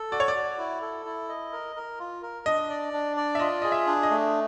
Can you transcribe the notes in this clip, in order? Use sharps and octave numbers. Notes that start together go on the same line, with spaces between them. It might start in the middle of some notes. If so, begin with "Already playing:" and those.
Already playing: A4
F#4 D5
C#5
D5
F#4
E4
A4
E4
D#5
A#4
A#4
F4
A#4
D4 D#5
D5
D4
D5
E5
F4 D#5
G#4 D#5
E5
D4
D#5
A3